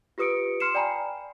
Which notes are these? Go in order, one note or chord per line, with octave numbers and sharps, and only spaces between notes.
F4 G4 B4 D#6 C#7 D7
C6 F6 C7 C#7 E7
D5 G5 G#5 A#5 B5